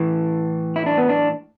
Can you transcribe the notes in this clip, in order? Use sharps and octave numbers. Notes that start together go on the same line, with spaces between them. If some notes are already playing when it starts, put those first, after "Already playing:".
Already playing: A2 E3
E4
D4
B3
D4